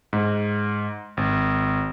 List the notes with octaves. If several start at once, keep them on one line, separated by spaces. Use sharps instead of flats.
G#2
G#1